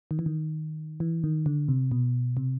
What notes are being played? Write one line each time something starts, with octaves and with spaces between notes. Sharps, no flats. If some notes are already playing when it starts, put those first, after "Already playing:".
D#3
E3
D#3
E3
D#3
D3
C3
B2
C3